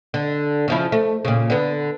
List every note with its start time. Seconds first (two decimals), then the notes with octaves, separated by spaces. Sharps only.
0.14 D3
0.68 C#3 F3 E4
0.92 A3
1.25 A#2 C#3
1.50 D3 B3